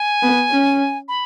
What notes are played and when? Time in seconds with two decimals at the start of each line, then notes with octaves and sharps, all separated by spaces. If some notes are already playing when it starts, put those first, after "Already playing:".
Already playing: G#5
0.23 B3
0.51 C#4
1.08 B5